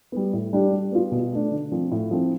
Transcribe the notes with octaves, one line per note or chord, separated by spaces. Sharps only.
G3 B3
A2
G3 D4 G4
G3
B3 F4
B2
A3 D4
D3
F3 C4
A2
F3 C4 E4